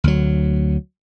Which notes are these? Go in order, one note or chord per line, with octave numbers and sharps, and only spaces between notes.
D2 F#3